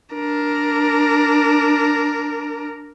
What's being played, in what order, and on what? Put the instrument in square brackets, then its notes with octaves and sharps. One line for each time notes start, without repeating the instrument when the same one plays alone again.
[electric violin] D4 A#4